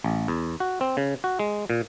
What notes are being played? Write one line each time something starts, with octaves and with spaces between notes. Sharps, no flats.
A1
E2
F#4
C4
C#3
F#4
G#3
A#2